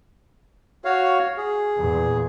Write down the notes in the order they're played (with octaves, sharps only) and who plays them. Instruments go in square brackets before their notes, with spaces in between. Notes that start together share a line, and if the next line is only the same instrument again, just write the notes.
[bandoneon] F#4 C#5 F5
G#4
[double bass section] E2 A#2